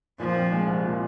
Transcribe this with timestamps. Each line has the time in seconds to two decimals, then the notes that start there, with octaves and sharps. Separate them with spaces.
0.19 A#2 F3
0.35 C4
0.52 G#3
0.68 C2
0.84 A#2